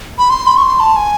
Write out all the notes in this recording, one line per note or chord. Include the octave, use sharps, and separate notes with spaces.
B5
C6
B5
C#6
C6
A5
G#5